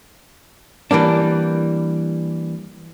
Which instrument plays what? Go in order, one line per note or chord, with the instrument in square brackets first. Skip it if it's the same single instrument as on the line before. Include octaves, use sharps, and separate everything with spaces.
[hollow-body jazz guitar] E3 G3 A#3 D4